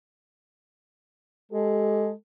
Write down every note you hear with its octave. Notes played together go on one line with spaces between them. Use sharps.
G#3 G4 A4